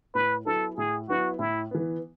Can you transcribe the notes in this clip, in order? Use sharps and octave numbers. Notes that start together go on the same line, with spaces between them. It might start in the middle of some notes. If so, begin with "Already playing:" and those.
A2 B4
F#3 B3 E4 A4
A2 G#4
F#3 B3 E4 F#4
A2 E4
E3 B3